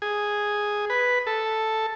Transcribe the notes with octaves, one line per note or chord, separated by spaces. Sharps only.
G#4
B4
A4